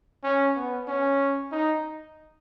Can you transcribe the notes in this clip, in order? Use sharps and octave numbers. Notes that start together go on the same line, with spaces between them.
C#4
B3
C#4
D#4